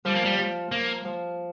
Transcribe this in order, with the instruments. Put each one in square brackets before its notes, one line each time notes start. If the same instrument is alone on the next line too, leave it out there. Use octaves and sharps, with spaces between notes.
[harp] F3 [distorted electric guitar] G3
[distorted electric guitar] A#3
G3
[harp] F3
[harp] F3 [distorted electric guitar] A#3
[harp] F3